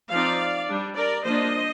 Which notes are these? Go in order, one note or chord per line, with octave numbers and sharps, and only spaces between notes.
F3 C4 D#4 D5 F5
G3 D4
A#4 D5
F3 A#3 D4 C5 D#5